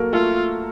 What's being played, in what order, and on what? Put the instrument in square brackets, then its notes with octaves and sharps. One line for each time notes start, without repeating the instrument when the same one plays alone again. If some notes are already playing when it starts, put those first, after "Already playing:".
Already playing: [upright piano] F#3 A#3 F#4 A4 A#4
[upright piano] A3 A4 [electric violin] F4